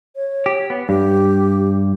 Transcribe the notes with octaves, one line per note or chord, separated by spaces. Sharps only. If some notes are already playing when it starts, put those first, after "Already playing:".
C#5
G4
B3
G2 G4